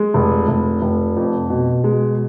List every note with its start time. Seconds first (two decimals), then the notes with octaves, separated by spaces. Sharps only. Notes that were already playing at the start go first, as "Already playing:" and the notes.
Already playing: G#3
0.14 F1
0.48 F1
0.82 F1
1.16 F2
1.50 B2
1.84 G#3